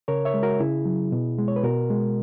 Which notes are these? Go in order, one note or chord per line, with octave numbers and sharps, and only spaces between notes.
C#3 A#4 C#5
C#5 E5
G#3
F#4 A#4
C#3 E4 G#4
F#3
B2
G#3
C#5
B4
B2 F#4 A#4
G#3